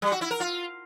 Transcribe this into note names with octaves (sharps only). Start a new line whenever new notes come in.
G3
F#4
E4
A#4
F4